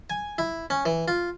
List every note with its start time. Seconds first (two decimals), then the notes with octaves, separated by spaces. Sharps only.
0.10 G#5
0.38 E4
0.70 C#4
0.86 E3
1.08 F4